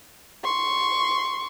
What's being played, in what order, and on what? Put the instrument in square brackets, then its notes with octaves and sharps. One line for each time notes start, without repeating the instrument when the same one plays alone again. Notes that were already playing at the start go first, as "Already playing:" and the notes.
[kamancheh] C6 C#6